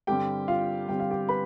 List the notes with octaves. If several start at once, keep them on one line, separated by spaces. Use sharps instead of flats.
G2 D3 G3 C4 G4 G5
F4 F5
G2 D3 G3 C4 G5
F5
G4 G5
B4 B5